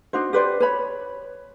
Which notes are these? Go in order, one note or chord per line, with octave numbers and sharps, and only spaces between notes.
D4 D#4 F#4 C5
G4 B4 C5 D5
B4 C#5 B5